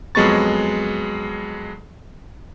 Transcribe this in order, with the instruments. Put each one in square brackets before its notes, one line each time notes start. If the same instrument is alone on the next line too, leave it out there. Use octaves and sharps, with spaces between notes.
[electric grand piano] F2 F#3 G#3 B3 C#6 A6